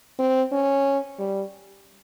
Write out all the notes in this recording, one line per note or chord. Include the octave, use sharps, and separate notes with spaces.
C4
C#4
G3